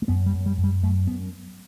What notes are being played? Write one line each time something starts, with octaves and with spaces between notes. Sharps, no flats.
A3
F#2 B3
G3
F#2
G3
F#2
G3
F#2 A3
F#2 B3